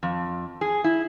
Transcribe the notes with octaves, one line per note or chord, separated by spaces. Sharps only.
F2
G#4
E4